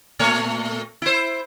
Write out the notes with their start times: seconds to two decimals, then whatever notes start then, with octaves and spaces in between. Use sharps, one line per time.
0.19 A#2 A3 C#5
1.02 E4 C5